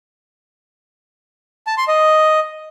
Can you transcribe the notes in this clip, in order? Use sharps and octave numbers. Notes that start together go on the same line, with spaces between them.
A5
C6
D#5